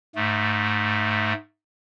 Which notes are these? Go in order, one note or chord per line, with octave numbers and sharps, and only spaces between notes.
G#2 A3